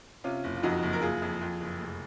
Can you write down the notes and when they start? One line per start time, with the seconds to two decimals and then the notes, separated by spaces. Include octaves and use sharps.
0.24 C3 C#4 F4
0.44 F#1
0.57 F4
0.63 F2 D#4 F#4
0.83 F#1
0.93 A#4
1.02 F#1 F4 G#4
1.22 F2
1.41 F2
1.61 F#1
1.81 F1